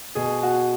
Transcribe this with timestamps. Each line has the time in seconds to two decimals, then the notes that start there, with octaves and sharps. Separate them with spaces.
0.15 B2 G#4
0.43 F#4